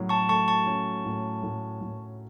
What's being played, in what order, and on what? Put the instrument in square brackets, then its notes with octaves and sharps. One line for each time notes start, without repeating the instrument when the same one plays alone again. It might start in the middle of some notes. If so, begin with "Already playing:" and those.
Already playing: [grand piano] A2 F#3 C#4
[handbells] A5 C#6
[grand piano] A3 [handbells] A5 C#6
[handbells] A5 C#6
[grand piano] C#4
A2
A2
A2